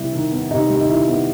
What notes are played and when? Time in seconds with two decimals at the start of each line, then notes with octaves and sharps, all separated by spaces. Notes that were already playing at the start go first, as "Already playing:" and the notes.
Already playing: C3 G3 E4
0.13 D#3
0.32 B3
0.51 C3 D#4
0.70 G3
0.76 D#4
0.89 D#3 E4
1.08 B3